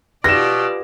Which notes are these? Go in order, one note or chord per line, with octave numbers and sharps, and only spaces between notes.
B2 F4 G4 D5 A#6 E7